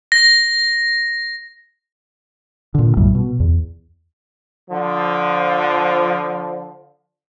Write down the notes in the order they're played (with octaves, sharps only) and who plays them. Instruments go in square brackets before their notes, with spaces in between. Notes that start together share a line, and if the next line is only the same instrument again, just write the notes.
[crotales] A#6
[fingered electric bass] A#2 D3
B1 F#2 A2 G3
B2
E2
[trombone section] D3 F3